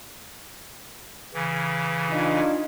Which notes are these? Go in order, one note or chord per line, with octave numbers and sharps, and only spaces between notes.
C#3 E3
D4 D#4 F4